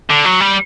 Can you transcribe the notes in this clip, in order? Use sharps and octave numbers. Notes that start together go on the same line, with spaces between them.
D3
F#3
G3